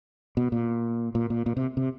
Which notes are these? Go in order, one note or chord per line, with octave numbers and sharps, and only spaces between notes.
B2
A#2
A#2
A#2
A#2
C3
C3